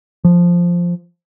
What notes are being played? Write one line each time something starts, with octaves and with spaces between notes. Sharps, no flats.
F3